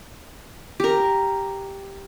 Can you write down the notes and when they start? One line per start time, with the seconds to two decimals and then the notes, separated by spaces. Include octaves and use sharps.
0.80 G4 A#4